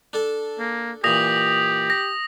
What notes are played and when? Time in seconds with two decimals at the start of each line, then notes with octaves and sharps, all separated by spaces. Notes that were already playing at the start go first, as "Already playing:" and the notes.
0.13 D4 A4 A5
0.59 A#3
1.04 A#2 E3 G4 D#6 A#6 F7
1.90 A#6